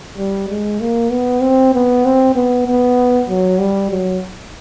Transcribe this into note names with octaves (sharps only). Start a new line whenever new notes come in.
G3
G#3
A#3
B3
C4
B3
C4
B3
B3
F#3
G3
F#3